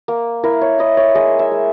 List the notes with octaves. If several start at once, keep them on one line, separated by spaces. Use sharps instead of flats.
A#3
E4 A#4
C#5
E4 D#5
C#5
G#3 D#5
E5
G#3